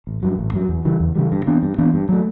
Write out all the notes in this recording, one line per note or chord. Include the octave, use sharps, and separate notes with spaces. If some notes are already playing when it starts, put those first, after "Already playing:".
A1
G2 F#3
A1
G2 F#3
E2
C#3 E3 G3
E2
C#3 E3 G3
G2
E3 B3 D4
G2
E3 B3 D4
G2
F#3 A3